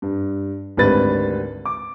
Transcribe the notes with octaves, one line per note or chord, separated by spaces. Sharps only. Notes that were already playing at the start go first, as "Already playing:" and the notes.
G2
G#1 D2 G3 B4 A6
D6